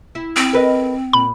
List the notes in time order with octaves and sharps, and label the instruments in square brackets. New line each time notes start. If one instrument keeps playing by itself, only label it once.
[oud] E4
[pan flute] C4
[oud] A#4 B4 D#5
[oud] A#2 [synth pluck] B5